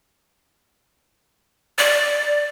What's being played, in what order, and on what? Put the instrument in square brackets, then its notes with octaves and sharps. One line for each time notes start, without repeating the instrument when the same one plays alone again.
[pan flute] D5